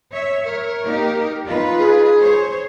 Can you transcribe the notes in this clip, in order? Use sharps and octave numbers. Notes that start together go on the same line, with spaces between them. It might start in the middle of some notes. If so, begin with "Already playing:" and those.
C#5 E5
A#4 C#5
A#3 D#4 G4
D#4 F4 B4
G#4
C5 C#5